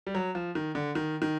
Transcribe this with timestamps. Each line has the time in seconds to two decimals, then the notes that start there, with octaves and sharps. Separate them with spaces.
0.07 G3
0.15 F#3
0.35 F3
0.55 D#3
0.75 D3
0.95 D#3
1.22 D#3